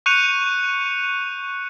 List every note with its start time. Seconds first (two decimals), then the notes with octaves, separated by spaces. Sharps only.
0.06 C#6 F#6 G6 C#7 D#7 F7